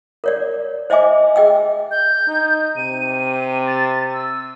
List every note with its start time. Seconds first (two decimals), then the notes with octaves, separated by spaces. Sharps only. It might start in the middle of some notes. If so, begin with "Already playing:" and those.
0.24 A#4 C#5 D5
0.90 C5 D#5 E5 G#5 D6
1.36 G#4 D#5 G5 E6
1.91 G6
2.27 D#4
2.77 C3 D#7
3.67 A6
4.13 E6